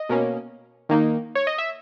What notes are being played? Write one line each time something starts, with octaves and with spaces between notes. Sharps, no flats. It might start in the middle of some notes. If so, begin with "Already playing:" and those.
Already playing: D#5
B2 A#3 C#4
D#3 A#3 D#4
C#5
D#5
E5